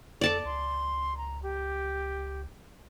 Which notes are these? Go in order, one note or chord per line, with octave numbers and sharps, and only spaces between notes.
F2 A4 D5 A5 D6
C#2 C6
A#5
G4